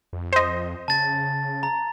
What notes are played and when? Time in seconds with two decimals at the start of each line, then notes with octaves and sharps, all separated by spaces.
0.13 F2
0.33 C5 D#5
0.88 C#3 A5 A6
1.63 A#5